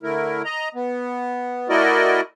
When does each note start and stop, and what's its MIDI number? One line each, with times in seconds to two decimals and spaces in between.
0.03 0.42 50
0.03 0.42 57
0.03 0.42 64
0.03 0.42 70
0.45 0.68 75
0.45 0.68 82
0.75 1.68 59
1.69 2.21 57
1.69 2.21 64
1.69 2.21 66
1.69 2.21 70
1.69 2.21 74
1.69 2.21 75